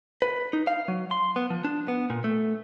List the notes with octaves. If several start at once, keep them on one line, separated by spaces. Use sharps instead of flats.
B4
D#4
F5
F#3
C6
B3
F3
D4
B3
A#2
A3